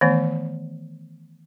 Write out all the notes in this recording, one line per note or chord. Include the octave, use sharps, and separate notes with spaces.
D#3 E3 A3 B3